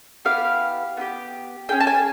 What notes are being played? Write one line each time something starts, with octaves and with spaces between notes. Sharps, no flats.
B3 E4 G4 F5
B3 E4 G4
C#4 F4 G#4 G5
A5
G#5